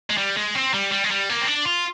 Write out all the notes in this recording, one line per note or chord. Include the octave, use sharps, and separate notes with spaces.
G#3
G3
G#3
C4
G3
G3
G#3
G3
A#3
C4
D4
F4